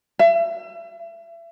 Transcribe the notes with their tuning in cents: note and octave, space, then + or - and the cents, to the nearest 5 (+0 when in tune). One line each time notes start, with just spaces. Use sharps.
E5 +35